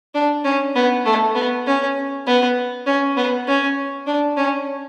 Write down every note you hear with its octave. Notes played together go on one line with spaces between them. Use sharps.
D4
C#4
B3
A3
B3
C#4
B3
C#4
B3
C#4
D4
C#4